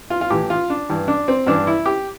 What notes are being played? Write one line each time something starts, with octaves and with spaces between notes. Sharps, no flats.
F4
F4
A2 E3 G4
F4
D4
G2 E3
D4
C4
G2 E3 D4
E4
G4